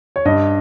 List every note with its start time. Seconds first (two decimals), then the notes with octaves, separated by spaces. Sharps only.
0.16 C#5
0.25 G2 D#5